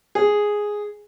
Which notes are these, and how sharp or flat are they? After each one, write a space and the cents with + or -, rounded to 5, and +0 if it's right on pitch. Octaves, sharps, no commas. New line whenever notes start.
G#4 +0